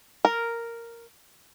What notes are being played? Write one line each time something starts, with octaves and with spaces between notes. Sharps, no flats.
A#4